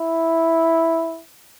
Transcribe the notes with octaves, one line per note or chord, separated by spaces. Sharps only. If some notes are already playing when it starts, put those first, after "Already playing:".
Already playing: E4